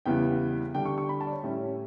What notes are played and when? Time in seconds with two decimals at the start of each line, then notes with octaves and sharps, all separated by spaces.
0.06 E2 C#3 E3 G3 B3 G5
0.75 D3 G3 D4 G5
0.85 C#6
0.98 C#6
1.09 B5
1.21 A5
1.27 D5
1.33 C#5
1.43 A2 G3 C#4 E4